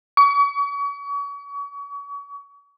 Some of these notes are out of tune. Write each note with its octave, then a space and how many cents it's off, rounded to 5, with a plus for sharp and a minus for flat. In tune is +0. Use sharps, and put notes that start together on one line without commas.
C#6 +40